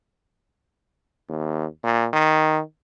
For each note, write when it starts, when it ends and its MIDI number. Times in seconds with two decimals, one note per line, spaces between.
1.29 1.66 39
1.84 2.06 46
2.13 2.61 51